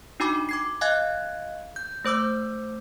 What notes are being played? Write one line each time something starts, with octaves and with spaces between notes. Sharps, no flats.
D4 D#4 F#4 G#5 B5 D6
D6 G#6 C7
D#5 F5 G#5 F#6 G#6
G6
A3 C5 D6 E6 G6